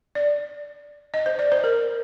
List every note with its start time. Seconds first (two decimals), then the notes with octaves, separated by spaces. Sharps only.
0.15 D5
1.14 D#5
1.26 C5
1.39 D5
1.52 C5
1.64 A#4